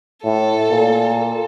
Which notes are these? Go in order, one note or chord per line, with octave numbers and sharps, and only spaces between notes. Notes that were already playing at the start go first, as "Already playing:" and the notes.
A2 A4
A#2
A4